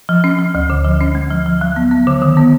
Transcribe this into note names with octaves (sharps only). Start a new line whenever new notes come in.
F3
C#4
F3
D2
D3
F3
C#4
G#3
F3
F3
F#3
B3
B3
D3
D#3
B3